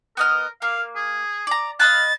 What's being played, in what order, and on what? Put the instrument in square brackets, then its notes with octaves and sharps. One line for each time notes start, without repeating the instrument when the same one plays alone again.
[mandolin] B3 D#5 F6 [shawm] A#4
[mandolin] A#3 [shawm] F5
[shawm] G#4
[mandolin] D5 A#5
[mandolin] D#5 B5 F#6 [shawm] F5 [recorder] A6